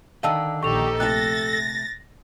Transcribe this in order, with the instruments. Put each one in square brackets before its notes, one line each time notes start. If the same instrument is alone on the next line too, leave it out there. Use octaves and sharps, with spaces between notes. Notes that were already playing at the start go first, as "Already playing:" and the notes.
[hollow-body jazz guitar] D3 D#3 D#5 [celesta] F5 A5 E6
[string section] A#1 D#4 G4 [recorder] A4 [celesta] C#6 F7
[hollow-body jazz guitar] C3 A3 E5 [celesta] F#6 [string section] A6 A#6